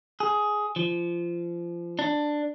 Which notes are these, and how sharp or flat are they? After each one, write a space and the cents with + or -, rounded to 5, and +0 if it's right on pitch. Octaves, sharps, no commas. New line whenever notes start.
G#4 +10
F3 -25
D4 +10